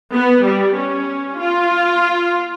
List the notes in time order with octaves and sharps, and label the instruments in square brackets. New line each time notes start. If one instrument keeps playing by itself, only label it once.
[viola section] B3
G3
C#4
F4